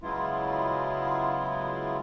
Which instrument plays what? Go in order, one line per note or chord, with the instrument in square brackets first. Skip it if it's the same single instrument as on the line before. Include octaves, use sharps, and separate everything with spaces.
[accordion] C#3 F#3 G#3 B3 E4 F4